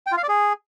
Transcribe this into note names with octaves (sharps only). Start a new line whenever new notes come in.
G5
F4
F5
D5
G#4